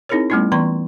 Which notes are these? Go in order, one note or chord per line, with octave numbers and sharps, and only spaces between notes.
C4 D#4 E4 G#4 A#4 C#5
G3 A3 B3 C#4 E4 F4
E3 B3 D5 A#5 C6 C#6